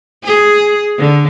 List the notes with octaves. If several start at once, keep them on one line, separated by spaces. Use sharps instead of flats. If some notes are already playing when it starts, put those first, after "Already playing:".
G#4
D3